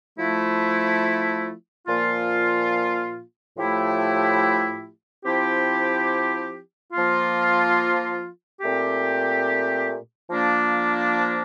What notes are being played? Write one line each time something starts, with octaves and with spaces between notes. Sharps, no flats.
F3 A3 E4
A#2 F3 A#3 F4
A2 F3 A3 E4 G4
F3 C4 E4 G4
F3 A#3 F4
A#2 A3 C4 G4
F3 A#3 D4